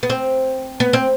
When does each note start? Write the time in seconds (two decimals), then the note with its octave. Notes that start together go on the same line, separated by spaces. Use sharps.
0.03 B3
0.10 C4
0.80 B3
0.93 C4